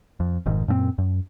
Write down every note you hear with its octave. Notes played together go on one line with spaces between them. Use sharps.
F2
F1 G#2 D#3
F#2 A#2 A3 C4
F#2